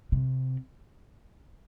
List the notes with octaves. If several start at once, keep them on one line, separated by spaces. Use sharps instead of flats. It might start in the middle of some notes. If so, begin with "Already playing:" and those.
C3